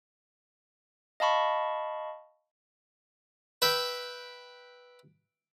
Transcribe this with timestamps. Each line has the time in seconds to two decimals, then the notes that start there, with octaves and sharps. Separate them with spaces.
1.20 D#5 F5 A5 B5 C#6
3.62 B4 E5 G5